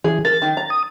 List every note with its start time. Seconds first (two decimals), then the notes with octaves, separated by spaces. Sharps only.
0.04 E3 G#4
0.25 A#4 A6
0.42 D#3
0.57 A#5
0.70 D#6